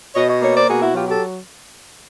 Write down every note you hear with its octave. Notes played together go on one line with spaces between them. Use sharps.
B2 C#5 D#5
C#5 D#5
A#3 C#5 D#5
C5 D5
B2 F#4 G#4
E4 F#4
F#3 F4 G4
G4 A4